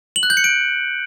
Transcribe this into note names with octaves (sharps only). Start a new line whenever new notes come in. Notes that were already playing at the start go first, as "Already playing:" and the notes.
F#7
F#6
G6
C#7
D7